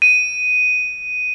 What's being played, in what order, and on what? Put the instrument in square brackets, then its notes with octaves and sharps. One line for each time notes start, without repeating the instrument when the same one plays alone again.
[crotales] D#7